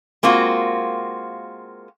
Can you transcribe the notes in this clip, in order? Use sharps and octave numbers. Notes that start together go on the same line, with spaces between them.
G#3 A#3 C4 F4 F#4